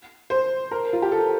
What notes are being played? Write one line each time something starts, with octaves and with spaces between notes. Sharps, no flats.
C5
A#4
F4
G4
A4